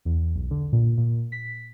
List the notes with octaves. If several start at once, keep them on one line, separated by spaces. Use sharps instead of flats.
E2
B1
D3
A#2
A#2
B6